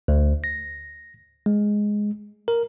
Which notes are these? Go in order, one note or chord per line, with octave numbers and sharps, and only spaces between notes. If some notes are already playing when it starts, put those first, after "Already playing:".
D2
A#6
G#3
A#4